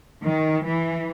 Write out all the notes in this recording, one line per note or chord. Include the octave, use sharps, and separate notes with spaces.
D#3
E3